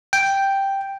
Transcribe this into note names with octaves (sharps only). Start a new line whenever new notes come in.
G5